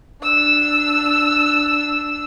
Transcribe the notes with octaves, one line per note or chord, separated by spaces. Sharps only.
D4 E6